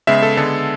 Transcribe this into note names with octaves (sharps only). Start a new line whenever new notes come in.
C#3 G#3 B3 E5
A4
D3 G#3 B3 A4